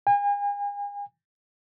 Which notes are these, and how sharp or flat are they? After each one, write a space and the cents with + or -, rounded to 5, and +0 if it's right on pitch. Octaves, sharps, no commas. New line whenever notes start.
G#5 -40